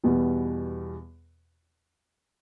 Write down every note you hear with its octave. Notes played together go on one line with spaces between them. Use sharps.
E2 B2 G3 B3